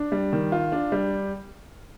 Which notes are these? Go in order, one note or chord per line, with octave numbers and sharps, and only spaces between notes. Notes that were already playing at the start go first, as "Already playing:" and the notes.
Already playing: D4
G3
D#3
F4
D4
G3